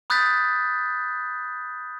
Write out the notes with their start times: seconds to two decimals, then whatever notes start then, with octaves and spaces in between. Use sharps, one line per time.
0.10 B5 D#6 F#6 G6 A6 B6